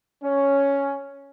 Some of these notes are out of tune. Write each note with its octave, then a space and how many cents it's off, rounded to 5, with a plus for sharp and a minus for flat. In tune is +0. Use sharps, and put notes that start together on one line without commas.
C#4 +5